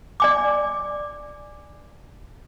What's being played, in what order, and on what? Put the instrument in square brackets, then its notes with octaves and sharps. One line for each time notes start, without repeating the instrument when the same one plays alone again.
[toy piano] D5 G#5 D6